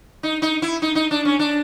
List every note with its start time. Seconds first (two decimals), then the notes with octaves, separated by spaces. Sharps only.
0.23 D#4
0.42 D#4
0.62 E4
0.82 D#4
0.95 D#4
1.11 D4
1.25 C#4
1.39 D4